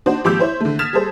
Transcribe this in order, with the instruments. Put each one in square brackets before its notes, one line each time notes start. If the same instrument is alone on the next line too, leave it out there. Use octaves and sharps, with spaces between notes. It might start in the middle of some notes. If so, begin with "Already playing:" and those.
[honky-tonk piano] D4 D#4 F#4 C5
G#1 F3 G4 D6 E6 G6
E4 C5 C#5
D3 A3
D#6 F6 G#6 A6 B6 E7
G3 G#4 A4 C5